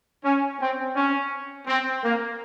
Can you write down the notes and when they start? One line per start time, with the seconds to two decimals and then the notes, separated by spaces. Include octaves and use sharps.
0.24 C#4
0.60 C4
0.96 C#4
1.68 C4
2.04 A#3